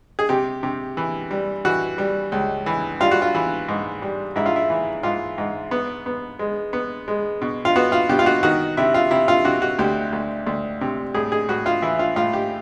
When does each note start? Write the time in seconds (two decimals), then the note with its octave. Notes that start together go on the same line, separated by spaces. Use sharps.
0.19 G#4
0.29 C3 G4
0.63 C3
0.97 E3
1.31 G3
1.65 E3 F#4
1.98 G3
2.32 C#2
2.66 E3
3.00 G3 F4
3.11 F#4
3.22 F4
3.35 E3
3.68 G#2
4.02 G3
4.36 G#2 E4
4.46 F4
4.56 E4
4.70 E3
5.03 G#2 F4
5.38 G#2
5.71 B3
6.06 B3
6.39 G#3
6.73 B3
7.08 G#3
7.42 B2
7.65 F4
7.76 B3 F#4
7.92 F4
8.09 B2 G4
8.19 F4
8.26 F#4
8.43 D#3 F#4
8.77 C3 E4
8.94 F4
9.11 C3 E4
9.28 F4
9.45 C3 F#4
9.62 F#4
9.79 D2 G4
10.13 D2
10.46 D2
10.81 C3
11.14 A2 G#4
11.32 G#4
11.49 A2 F#4
11.66 F4
11.82 E3 E4
11.99 F4
12.16 A2 F4
12.33 G4